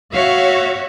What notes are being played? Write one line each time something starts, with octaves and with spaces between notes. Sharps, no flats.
F#4 C#5 E5 F5